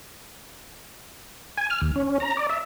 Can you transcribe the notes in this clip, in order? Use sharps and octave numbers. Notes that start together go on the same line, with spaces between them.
G#5
F6
D#2
C#4
A#5
D5
E5